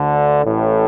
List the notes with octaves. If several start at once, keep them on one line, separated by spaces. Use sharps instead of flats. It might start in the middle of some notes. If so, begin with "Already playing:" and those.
Already playing: D2 D3
A1 A2